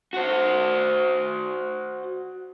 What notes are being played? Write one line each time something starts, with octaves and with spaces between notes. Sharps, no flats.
F#4 C5